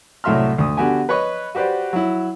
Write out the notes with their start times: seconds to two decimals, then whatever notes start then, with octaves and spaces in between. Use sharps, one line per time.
0.24 C2 A2 F#3 E5 C6 F6
0.58 D2 D#6
0.77 D3 B3 F#4 G4 G#5
1.09 B4 C#5 D#5 C#6
1.55 F#4 G4 B4 C5 D5
1.93 F#3 E4